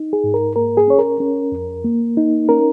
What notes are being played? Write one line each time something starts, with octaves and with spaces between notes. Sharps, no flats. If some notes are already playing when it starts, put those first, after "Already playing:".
Already playing: D#4
G#4
G#2
A#4
A#3 A#4
G#4
C#4 C#5
A#4
C#4
F2
A#3
D#4
C#4 A#4